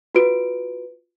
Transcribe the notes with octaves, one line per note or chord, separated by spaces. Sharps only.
F4 F#4 B4 D7